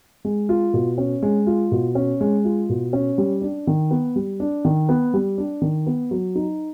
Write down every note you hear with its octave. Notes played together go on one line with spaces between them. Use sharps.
G#3
F4
B2
C#4
G#3
F4
B2
C#4
G#3
F4
B2
C#4
G3
D4
D#3
B3
G3
D4
D#3
B3
G3
D4
D#3
B3
F#3
D#4